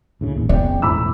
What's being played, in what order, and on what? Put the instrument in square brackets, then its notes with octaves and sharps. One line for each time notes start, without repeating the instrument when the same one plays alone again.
[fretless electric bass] D2 A2 C#3
A1 D#2 A#2
[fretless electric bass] F2 C#3 [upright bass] B3 [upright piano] D5 G5
[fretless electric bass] E1 A2 [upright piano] B5 D6 E6